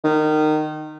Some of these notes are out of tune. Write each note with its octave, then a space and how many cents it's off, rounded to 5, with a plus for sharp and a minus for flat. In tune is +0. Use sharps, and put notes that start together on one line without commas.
D#3 -20